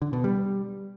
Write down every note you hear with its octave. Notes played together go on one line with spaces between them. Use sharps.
D3
B2
G3